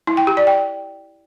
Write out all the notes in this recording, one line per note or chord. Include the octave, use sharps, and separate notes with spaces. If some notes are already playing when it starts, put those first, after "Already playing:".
E4
G5
G4
D5
G5